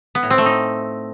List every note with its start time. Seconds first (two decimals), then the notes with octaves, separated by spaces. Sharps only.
0.15 B3
0.23 A2
0.30 C4
0.38 A3
0.46 D#4